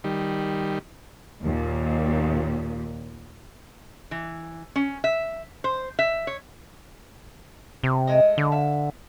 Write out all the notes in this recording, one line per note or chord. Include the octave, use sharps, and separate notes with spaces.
D#3 G3
D#2 A#2
E3
C#4
E5
C5
E5
C#5
C3
G#3 A3 D#5
D3
E5 F5